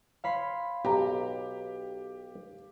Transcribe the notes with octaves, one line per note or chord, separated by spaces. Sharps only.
C#5 F5 B5 C6
B1 G4 A#5